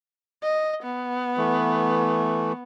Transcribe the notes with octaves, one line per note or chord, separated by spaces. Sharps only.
D#5
B3
E3 A3